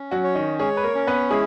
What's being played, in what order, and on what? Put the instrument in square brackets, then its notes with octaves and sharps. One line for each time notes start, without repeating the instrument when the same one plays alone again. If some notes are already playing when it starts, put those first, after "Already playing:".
Already playing: [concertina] C#4
[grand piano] F#3 F#4
[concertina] C#5
[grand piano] D#3 D#4
[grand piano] G#3 G#4 [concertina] C#5
[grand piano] B4
A#3 A#4
[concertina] C#4
[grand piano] B3 B4
[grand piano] G#3 G#4 [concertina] E4